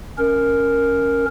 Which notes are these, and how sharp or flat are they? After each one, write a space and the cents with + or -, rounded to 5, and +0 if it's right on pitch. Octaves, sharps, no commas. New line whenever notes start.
C#4 +0 A#4 +0